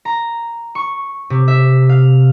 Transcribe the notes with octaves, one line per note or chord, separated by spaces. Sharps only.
A#5
C#6
C3
E5
F5